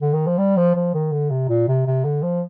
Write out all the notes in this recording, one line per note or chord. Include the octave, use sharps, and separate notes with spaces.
D3
D#3
F3
G3
F3
F3
D#3
D3
C3
A#2
C3
C3
D3
F3